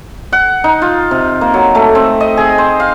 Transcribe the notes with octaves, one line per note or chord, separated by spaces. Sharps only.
F#5
D#4
F4
C3
A#3
F#3
A3
C4
D#5
G#4
C5
F5